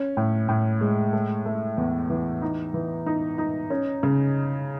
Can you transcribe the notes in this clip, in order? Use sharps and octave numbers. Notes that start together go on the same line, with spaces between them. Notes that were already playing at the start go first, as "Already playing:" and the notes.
Already playing: C#4
A2
A2
G#3
A3
A3
E2
E3
D#4
E3
D#4
D#4
C#4
C#3